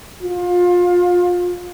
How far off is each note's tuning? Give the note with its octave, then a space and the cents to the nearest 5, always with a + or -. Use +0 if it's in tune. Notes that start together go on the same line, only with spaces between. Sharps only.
F4 +25